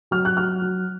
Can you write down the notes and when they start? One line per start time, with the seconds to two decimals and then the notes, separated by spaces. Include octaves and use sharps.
0.11 F#3 F6
0.25 F#6
0.37 F#3 F6
0.62 F#3